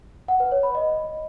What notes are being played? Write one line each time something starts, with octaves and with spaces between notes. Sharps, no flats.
F#5
B4
C#5
B5
D#5